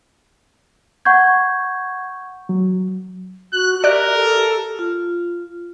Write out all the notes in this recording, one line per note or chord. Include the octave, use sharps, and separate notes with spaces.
F#5 C#6 G6 G#6
F#3
F#4 F#6
G4 A#4 D5 E5 F#6
A4
F4